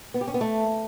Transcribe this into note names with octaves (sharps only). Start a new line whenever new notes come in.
B3
G4
C#4
B3
A3